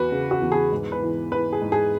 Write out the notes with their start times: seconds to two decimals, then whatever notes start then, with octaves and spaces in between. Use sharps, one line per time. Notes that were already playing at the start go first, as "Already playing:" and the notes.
Already playing: E2 F#4 B4
0.12 C#3
0.31 F#4
0.41 E2
0.52 G#4
0.72 G#2
0.92 B4
1.02 E3
1.32 E3 B4
1.53 G#4
1.62 G#2
1.72 G#4